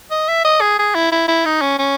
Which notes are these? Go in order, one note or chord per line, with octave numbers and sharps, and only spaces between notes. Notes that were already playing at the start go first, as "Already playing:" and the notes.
D#5
E5
D#5
G#4
G#4
E4
E4
E4
D#4
C#4
C#4